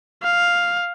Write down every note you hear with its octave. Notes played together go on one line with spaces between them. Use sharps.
F5